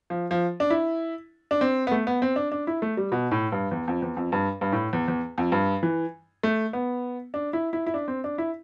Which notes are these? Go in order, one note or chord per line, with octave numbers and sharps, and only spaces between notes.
F3
F3
D4
E4
D4
C4
B3
A3
B3
C4
D4
D4
E4
A3
G3
B2
A2
G2
E2
F2
E2
F2
G2
G2
A2
E2
E2
F2
G2
E3
A3
B3
D4
E4
E4
E4
D4
C4
D4
E4